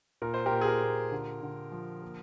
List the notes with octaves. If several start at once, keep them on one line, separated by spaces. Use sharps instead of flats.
A#2 A#4
C5
G4 A#4
A#2
G#4
G4 A#4
A#2
D3
D3
F3
A#3